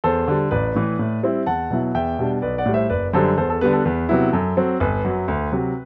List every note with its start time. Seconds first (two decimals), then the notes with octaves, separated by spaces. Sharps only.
0.04 E2 A4 C5
0.28 D3 G3
0.51 A1 B4 D5
0.75 A2 E3
0.99 A2
1.23 G3 C4 E4
1.46 E2 F#5 A5
1.70 B2 F#3 B3 E4
1.95 E2 E5 G5
2.19 B2 G3 D4
2.42 B1 B4 D5
2.58 D5 F#5
2.66 A2 G3
2.74 C5 E5
2.90 F#1 B4 D5
3.13 F#2 D3 G3 A4 C5
3.38 E2 A4 C5
3.50 A4
3.61 D3 G3 B3 B4
3.73 A4
3.85 E2 B4
4.09 C3 F#3 B3 E4
4.33 F#2 A4
4.57 F#3 C4
4.80 G1 B4
5.05 F#2 F#3
5.28 D2
5.52 C3 F#3